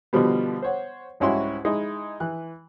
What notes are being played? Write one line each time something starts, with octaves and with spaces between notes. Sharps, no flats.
B2 D3 F3 G3 B3
C5 C#5 F#5
C2 G#2 C#4 E4 F#4 C6
G#3 D#4 E4
E3 F#6